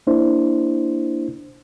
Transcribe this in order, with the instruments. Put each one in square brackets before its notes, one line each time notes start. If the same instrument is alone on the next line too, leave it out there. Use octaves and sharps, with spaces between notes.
[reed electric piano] A#3 D4 E4 C5